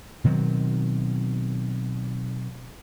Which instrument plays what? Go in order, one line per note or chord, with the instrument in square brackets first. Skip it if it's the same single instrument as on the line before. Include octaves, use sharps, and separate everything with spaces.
[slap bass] B2 D#3 F#3 C4